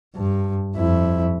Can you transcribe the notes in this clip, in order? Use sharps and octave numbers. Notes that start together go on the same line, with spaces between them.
G2
F2 E4